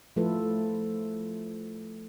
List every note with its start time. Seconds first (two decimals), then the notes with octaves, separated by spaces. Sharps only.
0.16 F3 A3 E4 F4 A4 B4